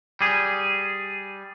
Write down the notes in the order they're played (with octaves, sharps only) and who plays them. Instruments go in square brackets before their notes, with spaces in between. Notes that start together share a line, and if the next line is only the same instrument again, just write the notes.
[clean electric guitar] G3 G#4